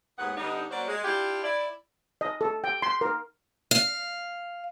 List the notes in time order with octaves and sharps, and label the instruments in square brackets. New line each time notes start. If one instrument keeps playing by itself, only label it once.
[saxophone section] D#2 G#2 B3 G#4 F#5
D3 G3 B3 D4 D#4
F#3 A#3 C#4 F#4 C5 D5
G#3
D4 E4 F4 G4
E4 D5
[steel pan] D#5
A4
G5
C6
A#4
[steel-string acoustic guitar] F5